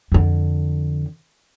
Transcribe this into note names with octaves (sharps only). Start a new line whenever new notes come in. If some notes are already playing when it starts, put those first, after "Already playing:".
F2 D3